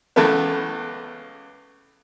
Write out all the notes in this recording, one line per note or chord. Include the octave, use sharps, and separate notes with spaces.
C#2 E3 A3 B3